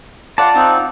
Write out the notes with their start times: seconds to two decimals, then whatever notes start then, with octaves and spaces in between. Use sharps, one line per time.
0.38 F4 D5 F#5 A5
0.55 C4 D#4